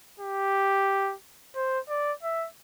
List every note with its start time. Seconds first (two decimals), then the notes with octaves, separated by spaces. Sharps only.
0.20 G4
1.55 C5
1.89 D5
2.23 E5